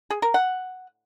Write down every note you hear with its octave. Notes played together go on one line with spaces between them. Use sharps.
G#4
A#4
F#5